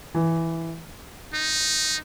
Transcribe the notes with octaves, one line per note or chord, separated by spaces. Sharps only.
E3
D#4